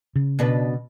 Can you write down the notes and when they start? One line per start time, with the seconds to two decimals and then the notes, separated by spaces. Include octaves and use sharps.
0.16 C#3
0.39 B2 D4 B4